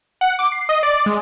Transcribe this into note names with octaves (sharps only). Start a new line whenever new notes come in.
F#5
D6
C7
D#5
D5
G#3